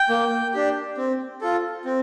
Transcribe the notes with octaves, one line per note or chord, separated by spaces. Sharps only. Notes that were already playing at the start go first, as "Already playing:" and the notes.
Already playing: G5
A#3
D4 G4
C4
F4 A4
C4